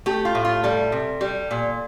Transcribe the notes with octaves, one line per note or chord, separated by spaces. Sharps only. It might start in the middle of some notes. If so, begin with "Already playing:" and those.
A3 G4
F4
A2
F4
G3 A4
C3
G3
A#2